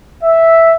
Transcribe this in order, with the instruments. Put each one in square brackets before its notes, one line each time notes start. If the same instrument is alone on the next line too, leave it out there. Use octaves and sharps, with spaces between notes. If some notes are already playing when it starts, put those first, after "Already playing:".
[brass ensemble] E5